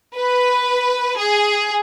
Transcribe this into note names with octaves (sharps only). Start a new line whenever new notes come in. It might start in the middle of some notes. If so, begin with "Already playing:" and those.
B4
G#4